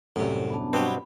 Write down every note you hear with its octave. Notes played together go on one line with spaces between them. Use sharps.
C2 F#2 A2 C3
B3 D4 A5
G2 B2 F#3 C4 G4 B4
B5